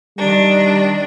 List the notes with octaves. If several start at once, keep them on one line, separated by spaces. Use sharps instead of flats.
D#3 G3 D4